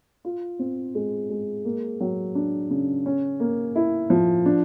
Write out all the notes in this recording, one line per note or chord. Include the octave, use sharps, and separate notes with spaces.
F4
C4
G#3
G#3
A#3
F#3
D4
C#3
C#4
A#3
E4
F3
D4